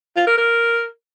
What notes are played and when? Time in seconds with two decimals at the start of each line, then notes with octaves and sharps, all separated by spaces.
0.16 F4
0.27 A#4
0.38 A#4